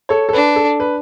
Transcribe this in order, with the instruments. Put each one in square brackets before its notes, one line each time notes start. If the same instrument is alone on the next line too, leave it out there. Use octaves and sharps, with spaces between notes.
[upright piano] A4 C#5
A4
[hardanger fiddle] D4 [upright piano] B4
[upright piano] A4
B4